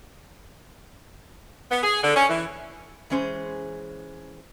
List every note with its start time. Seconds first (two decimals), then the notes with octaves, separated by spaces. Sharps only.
1.71 B3
1.82 G#4
2.02 D3
2.16 C#4
2.29 E3
3.10 E3 G#3 C#4 G#4 C5